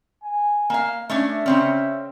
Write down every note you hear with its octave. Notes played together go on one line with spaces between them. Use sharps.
G#5
A#3 F5
A3 C#4 D4 E5
C#3 C4 C#4